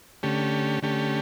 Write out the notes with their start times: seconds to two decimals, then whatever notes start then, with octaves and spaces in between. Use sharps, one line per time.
0.23 D3 A3 C#4 G4
0.82 D3 A3 C#4 G4